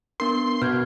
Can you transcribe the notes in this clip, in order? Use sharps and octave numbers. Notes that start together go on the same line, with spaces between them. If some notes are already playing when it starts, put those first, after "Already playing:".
B3 D4 A#4 C6
B2 F6 G6 G#6